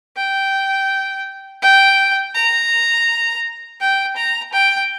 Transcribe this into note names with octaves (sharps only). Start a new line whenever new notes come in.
G5
G5
A#5
G5
A#5
G5